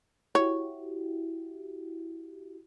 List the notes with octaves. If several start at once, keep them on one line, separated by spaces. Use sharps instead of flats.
E4 F#4 G4 C#5